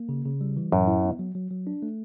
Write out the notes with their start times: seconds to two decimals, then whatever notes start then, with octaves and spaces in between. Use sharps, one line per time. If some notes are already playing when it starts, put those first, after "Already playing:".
Already playing: A#3
0.09 C#3
0.25 C#3
0.41 G3
0.57 E3
0.72 F#2 A2
0.87 E4
1.03 B3
1.19 F#3
1.35 F#3
1.51 F#3
1.67 D4
1.82 A3